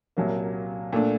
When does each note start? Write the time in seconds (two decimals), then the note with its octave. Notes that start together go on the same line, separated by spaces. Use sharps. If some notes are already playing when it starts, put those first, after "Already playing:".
0.17 C2 A#2 F#3 A#3
0.93 A#2 A3 D4